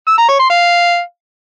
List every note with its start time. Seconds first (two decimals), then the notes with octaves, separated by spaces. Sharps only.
0.07 E6
0.18 A#5
0.29 C#5
0.39 C6
0.50 F5